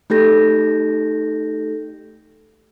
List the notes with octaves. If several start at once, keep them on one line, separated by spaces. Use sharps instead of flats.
A3 D#4 G4 A4 G6 A#6